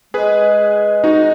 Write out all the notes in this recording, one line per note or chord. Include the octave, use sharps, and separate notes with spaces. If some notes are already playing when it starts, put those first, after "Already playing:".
G#3 G#4 B4
D#4 F#4